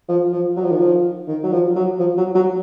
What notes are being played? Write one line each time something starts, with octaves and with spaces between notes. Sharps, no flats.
F3
F3
F#3
F3
D#3
F3
D#3
F#3
F3
F#3
F3
F#3
F#3